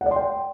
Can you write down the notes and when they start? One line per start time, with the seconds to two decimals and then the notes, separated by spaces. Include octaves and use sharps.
0.01 F#5
0.06 D5
0.11 C6
0.16 G5